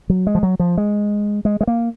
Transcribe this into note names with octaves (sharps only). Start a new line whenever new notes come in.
F#3
G#3
F3
F#3
F3
G#3
G#3
G#3
A#3